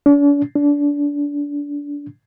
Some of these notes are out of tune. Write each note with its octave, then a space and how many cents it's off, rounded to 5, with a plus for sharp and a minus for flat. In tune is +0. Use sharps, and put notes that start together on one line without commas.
D4 -45
D4 -25